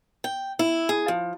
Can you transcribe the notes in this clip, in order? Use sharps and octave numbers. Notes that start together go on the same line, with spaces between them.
G5
E4
G#4
F3